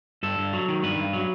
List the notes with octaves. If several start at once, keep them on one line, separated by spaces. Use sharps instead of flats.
G2 A4
G2
F#3
D#3
G2 B4
G2
F#3